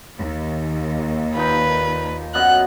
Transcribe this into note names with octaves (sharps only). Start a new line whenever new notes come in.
D#2
A#2 D#4 B4
F#2 B3 D#5 F#6